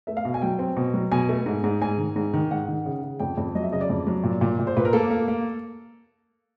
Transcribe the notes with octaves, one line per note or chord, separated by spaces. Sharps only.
A3 E5
F5
B2
G#5
F#3 G5
C4
B2
F#3
B2 G#5
A3
G#2
G#2
G#2 G#5
D#3
G#2
D#3
G#2 F#5
D#3
C#3
C#3
F2 G5
F2
F#3 D#5
E5
C#3 D#5
D5
F2
F#3
A#2
A#2
A#2
C5
A#2 B4
A#4
A#3 A4
A#3
A#3